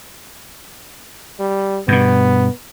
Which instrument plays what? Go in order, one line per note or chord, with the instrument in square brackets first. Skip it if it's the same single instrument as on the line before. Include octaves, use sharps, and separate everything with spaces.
[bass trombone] G3
[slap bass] G2 B2 [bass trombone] B3